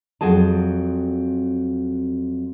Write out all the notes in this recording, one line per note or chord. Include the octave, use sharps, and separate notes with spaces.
F2 C3 F#3 C4 G#4 A5